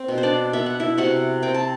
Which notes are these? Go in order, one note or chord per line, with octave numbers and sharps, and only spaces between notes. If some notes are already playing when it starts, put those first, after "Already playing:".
Already playing: C4
B2
C5
D4 D5
B3 E5
F#5
E4 E5
C3 F#4 F#5
C4 G5
A5